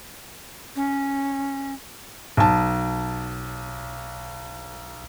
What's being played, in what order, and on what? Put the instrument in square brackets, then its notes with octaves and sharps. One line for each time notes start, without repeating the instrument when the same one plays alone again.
[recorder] C#4
[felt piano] B1 A5